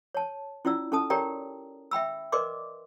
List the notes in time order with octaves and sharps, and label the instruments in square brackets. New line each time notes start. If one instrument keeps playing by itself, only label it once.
[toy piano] C#5 A5
C#4 E4 F4 D5 E6
C#4 A4 A5 D#6
G4 A#4 C#5 D5 G5 A#5
E5 G5 B5 E6
A#4 B4 D5 D#5 C6 D6